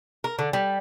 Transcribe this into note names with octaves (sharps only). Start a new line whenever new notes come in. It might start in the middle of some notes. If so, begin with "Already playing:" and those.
A#4
D3
G3